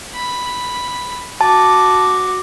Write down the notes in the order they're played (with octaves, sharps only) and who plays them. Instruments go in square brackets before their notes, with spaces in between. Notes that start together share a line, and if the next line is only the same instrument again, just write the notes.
[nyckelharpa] B5
[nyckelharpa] F#4 D6 [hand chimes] A5